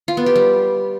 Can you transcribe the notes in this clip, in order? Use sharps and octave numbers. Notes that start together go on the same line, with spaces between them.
F4
B3
G4
G3